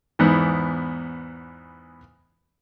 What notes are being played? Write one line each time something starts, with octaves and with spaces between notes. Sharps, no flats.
E2 G#2 E3 B3 F#6